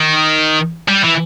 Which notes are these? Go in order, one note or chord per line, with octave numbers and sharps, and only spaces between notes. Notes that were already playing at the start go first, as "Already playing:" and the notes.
Already playing: D#3
G3
E3